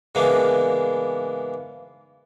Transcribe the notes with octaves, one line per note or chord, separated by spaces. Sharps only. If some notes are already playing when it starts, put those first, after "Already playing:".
G#2 C#3 E3 A#3 B3 D4